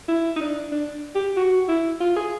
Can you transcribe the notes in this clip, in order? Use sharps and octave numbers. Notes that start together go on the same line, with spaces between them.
E4
D#4
D4
D4
G4
F#4
E4
F4
G#4